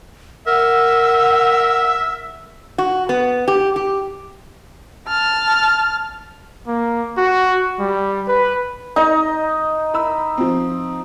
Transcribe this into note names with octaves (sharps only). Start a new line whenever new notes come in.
A#4 E5 F#5
F#4
B3
G4
G4
A5 F6
A#3
F#4
G3
B4
D#4 D#5
E4 B5 E6
F3 C4